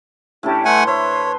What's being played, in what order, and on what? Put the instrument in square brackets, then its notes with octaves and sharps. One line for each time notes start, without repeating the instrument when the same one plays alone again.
[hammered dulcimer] A2 D4 A5 [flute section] C#4 E4 G4
[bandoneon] A3 F#5 G#5 [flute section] B4 C6
[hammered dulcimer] C5 E5 [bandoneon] C#5